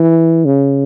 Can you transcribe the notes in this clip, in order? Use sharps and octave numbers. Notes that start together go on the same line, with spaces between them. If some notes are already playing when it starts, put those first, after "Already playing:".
Already playing: E3
C#3